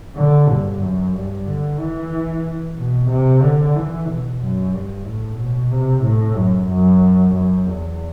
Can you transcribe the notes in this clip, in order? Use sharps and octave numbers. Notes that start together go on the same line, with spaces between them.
D3
G2
F#2
G2
D3
E3
B2
C3
D3
E3
B2
F#2
G2
A2
B2
C3
A2
F#2
F#2
F#2
E2